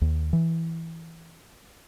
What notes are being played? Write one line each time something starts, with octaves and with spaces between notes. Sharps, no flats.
D#2
E3